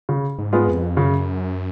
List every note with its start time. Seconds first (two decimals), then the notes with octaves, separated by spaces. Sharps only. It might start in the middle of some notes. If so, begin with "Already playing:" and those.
0.09 C#3
0.38 G#2
0.53 G#3 B3 F4 G#4
0.68 F2
0.97 F#2 C#3